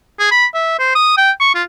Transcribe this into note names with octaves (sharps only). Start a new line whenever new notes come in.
G#4
B5
E5
C5
D#6
G5
C#6
F4